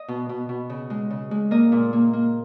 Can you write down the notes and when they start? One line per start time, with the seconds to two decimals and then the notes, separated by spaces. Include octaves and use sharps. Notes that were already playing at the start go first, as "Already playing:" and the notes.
Already playing: D#5
0.08 B2
0.29 B2
0.49 B2
0.70 C#3
0.90 G#3
1.10 C#3
1.31 G#3
1.51 A#3 D#5
1.72 A#2
1.93 A#3
2.13 A#3